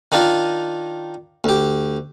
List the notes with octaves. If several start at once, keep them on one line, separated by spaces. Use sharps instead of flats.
D#3 D4 D#4 F4
D2 G4